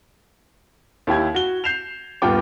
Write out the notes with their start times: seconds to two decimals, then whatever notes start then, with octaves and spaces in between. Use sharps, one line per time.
1.07 D#2 E4 G4 G#6
1.35 F#4 G7
1.64 G6 C7 E7 F7
2.22 D#1 G2 B3 F4 G5 D6